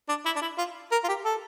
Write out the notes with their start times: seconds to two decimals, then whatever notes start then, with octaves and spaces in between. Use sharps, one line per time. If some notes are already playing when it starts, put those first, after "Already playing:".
0.09 D4
0.26 E4
0.36 D4
0.42 E4
0.58 F4
0.92 A#4
1.04 F4
1.08 G4
1.25 A4